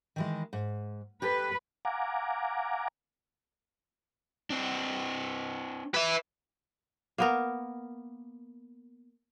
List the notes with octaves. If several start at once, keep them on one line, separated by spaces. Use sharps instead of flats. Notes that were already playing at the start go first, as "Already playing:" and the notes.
D#3 E3 G#3
G#2
G4 A4 B4
F5 F#5 G#5 A#5 D6
C4 D4
B4 E5
A#3 B3 A#4